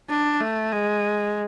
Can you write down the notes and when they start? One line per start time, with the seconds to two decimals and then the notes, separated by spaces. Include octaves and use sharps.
0.09 D4
0.41 A3
0.72 G#3